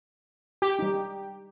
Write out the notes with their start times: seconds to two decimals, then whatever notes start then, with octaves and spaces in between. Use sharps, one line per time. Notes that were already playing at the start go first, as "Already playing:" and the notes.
0.62 G4
0.79 G3 D#4